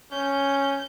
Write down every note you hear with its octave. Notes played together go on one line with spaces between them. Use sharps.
C#4 G6